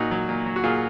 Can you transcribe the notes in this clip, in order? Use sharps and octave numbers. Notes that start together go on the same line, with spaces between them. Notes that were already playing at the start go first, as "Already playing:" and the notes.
Already playing: A#2 D#4 F#4
F#3
A#2
F#3
F#4
A#2 F4 G#4